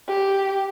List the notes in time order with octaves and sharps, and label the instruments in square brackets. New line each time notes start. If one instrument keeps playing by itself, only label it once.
[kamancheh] G4